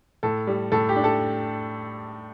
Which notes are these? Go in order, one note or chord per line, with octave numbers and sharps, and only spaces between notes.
A2 A4
G3
A2 A4
G4
D4
A4